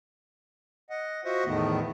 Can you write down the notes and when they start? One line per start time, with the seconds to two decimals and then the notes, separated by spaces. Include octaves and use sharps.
0.90 D#5 F#5
1.25 F4 F#4 C5 D#5 E5 F#5
1.46 E2 A2 D#3 A3 B3